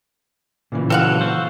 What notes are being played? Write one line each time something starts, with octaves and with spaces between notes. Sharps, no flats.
A#2 C#3 E3
F#3 C4 A4 F5 F#5
F#4 A4 C5